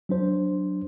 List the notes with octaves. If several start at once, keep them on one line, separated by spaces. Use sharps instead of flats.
F#3 D4 C5